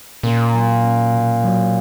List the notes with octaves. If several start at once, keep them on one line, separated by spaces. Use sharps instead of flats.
A#2 C#4
F#3
C#4
B2
F#3